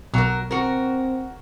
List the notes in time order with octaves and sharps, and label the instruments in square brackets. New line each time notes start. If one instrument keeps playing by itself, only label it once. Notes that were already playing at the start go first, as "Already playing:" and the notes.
[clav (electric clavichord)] B1 [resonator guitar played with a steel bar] F#3 A#4
[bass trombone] C4 [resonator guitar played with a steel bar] F#4 A#4